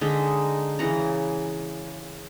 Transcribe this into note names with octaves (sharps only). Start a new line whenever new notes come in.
D3 G#3 D#4 E5
C#3 E3 F#5 A#5